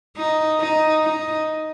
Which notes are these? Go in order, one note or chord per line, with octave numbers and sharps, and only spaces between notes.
D#4
D#4
D#4